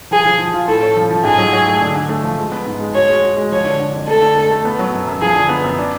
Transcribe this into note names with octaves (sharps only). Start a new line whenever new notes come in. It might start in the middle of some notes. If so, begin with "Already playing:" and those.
F3 G#4
F3
F3
F4
A2 A4
C#4
F3
F3
G#2 G#4
F#3
F#3
A3
D3
D3
A3
F3
G#3
B3
G#2
G#3
F#4 C#5
G#3
F#4
G#3
F3 C#5
D3
D3
F2
A3 A4
D3
A3
A3
B3
F#3
F#2
F#2
F3 G#4
D3
B3
F#2
D4